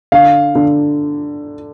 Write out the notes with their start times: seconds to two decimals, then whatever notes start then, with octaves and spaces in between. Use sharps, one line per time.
0.12 D3 F5
0.55 D3